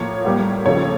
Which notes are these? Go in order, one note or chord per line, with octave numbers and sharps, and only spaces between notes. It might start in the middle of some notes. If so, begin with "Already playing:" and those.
Already playing: A2 F3 A#3 C#5
A2 G3 A#3
C#3 F3 A3 C#5